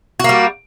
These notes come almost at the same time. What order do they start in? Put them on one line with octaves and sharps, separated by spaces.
F#4 A#3 G3